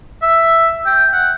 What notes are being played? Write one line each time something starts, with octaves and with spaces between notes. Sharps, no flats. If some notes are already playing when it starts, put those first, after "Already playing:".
E5
G5
F#5